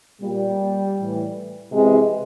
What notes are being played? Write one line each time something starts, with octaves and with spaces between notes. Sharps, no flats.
A#2 G3
A2 E3
C3 E3 G#3